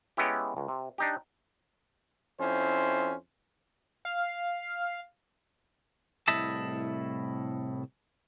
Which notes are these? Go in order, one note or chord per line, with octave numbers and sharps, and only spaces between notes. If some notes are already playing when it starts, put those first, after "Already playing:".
G#3 B3 C#4 E4 G4
C#2
C3
D4 D#4 G4
F2 C#4 E4 C5
F5
C2 A2 E4 D#5 E5 A5